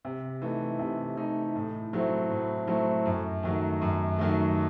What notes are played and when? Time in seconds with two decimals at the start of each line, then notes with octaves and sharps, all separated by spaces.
0.05 C3
0.42 E3 A3 D#4
0.79 C3
1.17 E3 A3 D#4
1.56 A2
1.93 F#3 A3 C4 E4
2.30 A2
2.67 F#3 A3 C4 E4
3.06 F#2
3.43 D#3 F#3 A3
3.82 F#2
4.19 D#3 F#3 A3